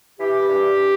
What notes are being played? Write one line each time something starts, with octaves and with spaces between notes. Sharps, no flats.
E3 G4
G2